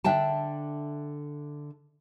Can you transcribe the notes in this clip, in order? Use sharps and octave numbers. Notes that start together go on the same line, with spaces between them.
D3 D4 E5 G5 A5